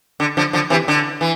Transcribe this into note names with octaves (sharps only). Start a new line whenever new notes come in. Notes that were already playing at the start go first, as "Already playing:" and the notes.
D3
D3 F3
D3 F3
C3 E3
D3
E3